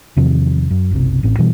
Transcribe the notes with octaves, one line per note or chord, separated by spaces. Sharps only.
E2 C3 D#3 F3
F#2
F#1 B1 C3
A1 A2 C4
B2 E3 G3